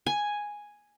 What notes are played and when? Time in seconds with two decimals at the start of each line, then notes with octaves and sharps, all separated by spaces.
0.06 G#5